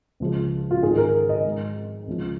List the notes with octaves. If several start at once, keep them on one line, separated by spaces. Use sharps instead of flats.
C#2 C#3 F3 G#3
F4
G#2 D#3 G#3 G#4
A#4
D#5
G#2 G#3
C#2 C#3 F3